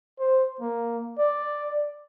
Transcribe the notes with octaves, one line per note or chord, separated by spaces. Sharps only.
C5
A#3
D5